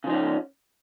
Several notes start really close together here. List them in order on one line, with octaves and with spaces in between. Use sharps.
C#3 F3 D#4 C#4